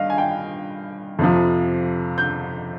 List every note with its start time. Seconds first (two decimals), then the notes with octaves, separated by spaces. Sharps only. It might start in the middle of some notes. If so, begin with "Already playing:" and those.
Already playing: G2 D#5 F5
0.10 G#5
0.18 G5
1.19 F2 C3 F3
2.18 G6